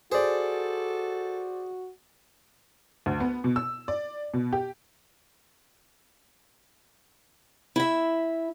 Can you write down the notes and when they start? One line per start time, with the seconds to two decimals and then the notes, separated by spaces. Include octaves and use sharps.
0.12 F#4 G#4 A4 C5 D5
3.06 D2
3.20 B3
3.44 B2
3.56 E6
3.88 D5
4.34 B2
4.53 G4
7.76 E4 E5